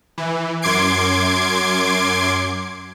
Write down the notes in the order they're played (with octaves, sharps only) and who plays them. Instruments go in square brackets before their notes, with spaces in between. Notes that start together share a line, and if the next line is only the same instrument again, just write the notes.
[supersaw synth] E3
F#2 C6 D6 G#6 C7 D7